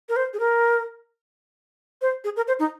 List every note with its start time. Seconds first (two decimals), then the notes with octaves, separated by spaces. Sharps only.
0.09 A#4
0.16 C5
0.34 G#4
0.40 A#4
2.02 C5
2.24 G#4
2.36 A#4
2.48 C5
2.59 D#4